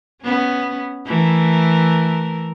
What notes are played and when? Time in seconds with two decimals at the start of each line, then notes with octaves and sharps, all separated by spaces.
0.23 B3 C#4
1.06 E3 A3 A#4